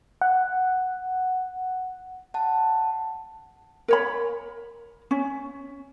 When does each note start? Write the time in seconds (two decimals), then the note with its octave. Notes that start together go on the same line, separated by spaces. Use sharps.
0.21 F#5
2.34 F#5 A5
3.88 A#4 C#5 B5
5.11 C#4